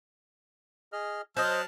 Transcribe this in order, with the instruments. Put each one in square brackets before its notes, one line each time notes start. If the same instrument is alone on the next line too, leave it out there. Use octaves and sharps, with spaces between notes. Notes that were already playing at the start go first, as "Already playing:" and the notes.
[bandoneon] G#4 D#5 F6
[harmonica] F#3 A5 F6 [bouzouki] C5 D#5 [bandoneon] F#6